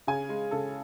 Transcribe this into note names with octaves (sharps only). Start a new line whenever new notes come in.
C#3 G#5
G#3
C#3 A4